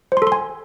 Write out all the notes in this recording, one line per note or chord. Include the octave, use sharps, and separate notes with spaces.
C5
C6
A4
C6
G#5